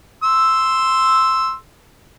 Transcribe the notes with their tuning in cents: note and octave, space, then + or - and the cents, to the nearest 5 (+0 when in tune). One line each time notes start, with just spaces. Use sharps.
C6 +0 E6 +0